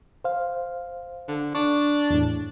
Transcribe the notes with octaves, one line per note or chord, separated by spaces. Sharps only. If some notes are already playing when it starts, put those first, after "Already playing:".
C5 F5
D3
D4 C#6
E2 A2